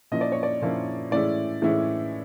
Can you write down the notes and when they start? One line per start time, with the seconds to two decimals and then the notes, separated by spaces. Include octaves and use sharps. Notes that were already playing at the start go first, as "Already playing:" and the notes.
0.11 A#2 F3 A#3 C#4 E4 D#5
0.21 D5
0.32 C#5
0.43 D5
0.61 A#2 F3 A#3 C#4 E4
1.11 A2 E3 G#3 C#4 E4 D5
1.62 A2 E3 G#3 C#4 E4